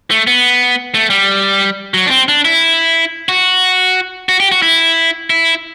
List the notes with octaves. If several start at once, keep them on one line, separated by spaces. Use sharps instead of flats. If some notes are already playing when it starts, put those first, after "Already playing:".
A3
B3
A3
G3
F#3
D4
C4
D4
E4
F#4
F#4
G4
F#4
E4
E4